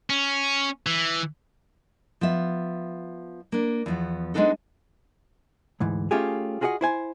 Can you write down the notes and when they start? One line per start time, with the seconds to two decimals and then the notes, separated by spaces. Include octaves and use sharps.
0.10 C#4
0.86 E3
2.21 F3 B3 E5
3.52 A#3 D4
3.86 E2 F3 B3
4.34 G#3 A3 B3 D4 D#4 A4
5.80 D2 G#2 E3
6.11 A3 C#4 F4 G4 G#4
6.61 F4 F#4 G#4 A#4 D#5 F#5
6.81 E4 C5 G#5